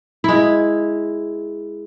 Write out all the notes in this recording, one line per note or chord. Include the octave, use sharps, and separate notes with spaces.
G#3 E4